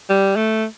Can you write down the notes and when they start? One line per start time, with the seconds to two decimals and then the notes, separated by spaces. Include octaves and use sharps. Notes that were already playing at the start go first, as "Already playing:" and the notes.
0.10 G3
0.36 A3